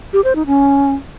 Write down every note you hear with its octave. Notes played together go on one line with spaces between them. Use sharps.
G4
C5
D#4
C#4